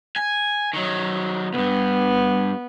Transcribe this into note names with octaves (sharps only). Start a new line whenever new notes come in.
G#5
D#3 F#3
D2 G2 B3